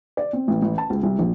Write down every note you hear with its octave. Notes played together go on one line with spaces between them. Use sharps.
D5
C4
A1
A1
A5
C#2
C2
A#1